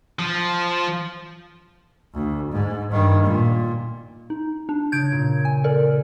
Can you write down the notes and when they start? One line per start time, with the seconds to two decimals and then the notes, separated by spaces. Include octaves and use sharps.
0.19 F3
2.13 D2
2.52 G#2
2.91 G2 D#3
3.23 A#2
4.30 D#4
4.69 D4
4.92 C#3 G6 G#6 D7
5.12 A#2
5.45 G#5
5.64 A4 A#4 D5